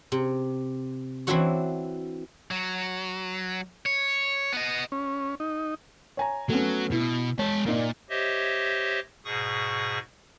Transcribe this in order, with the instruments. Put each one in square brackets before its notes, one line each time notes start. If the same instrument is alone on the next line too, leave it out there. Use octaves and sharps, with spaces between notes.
[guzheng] C3
E3 C4 D4 E4 F#4 C#5
[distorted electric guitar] F#3
C#5
B3 D#5
[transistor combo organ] C#4
D#4
[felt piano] C#5 G#5 A#5
[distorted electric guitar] F#3 [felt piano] A3 B3 C#4
[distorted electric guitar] B2 [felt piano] E4
[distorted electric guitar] G#3 A5 [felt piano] C#5
[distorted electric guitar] A#2 [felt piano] A#3 D#4 D5
[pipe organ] G4 C5 C#5 D#5 E5
G#2 B2 G#4 C#6 D#6